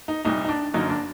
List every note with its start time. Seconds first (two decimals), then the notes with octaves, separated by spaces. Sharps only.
0.08 D#4
0.25 C2 A#2 G3 D#4
0.45 D#4
0.49 D4
0.74 G1 F#2 D3 F#3 A#3 D#4
0.89 D4